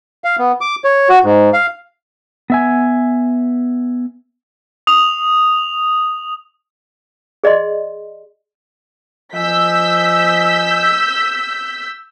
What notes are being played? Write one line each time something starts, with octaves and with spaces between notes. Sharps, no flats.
F5
B3
D6
C#5
F#4
G#2
F5
B3 E5 G#5
D#6 F7
G#4 D5 D#5 C6
F3 D#5 G#5 E6 G6 B6